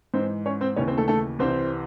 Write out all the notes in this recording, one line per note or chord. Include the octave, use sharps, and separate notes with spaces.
G#2 E3 C4 C5
C#4 C#5
C4 C5
D#2 C#3 E3 C#4 C#5
C4 C5
A3 A4
A3 A4
C2 C3 E3 C4 C5